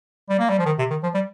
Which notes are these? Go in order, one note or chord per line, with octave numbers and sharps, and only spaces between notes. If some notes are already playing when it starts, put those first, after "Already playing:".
G3
A#3
G3
F3
D#3
C3
D#3
F3
G3